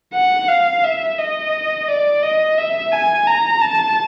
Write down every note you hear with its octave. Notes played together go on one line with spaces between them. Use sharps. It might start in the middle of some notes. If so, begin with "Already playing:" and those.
F#5
F5
E5
D#5
D5
D#5
E5
G#5
A#5
A5